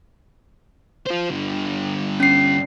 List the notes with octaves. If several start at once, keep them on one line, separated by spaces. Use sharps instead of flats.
F4 C5
G2 D3
C#4 C7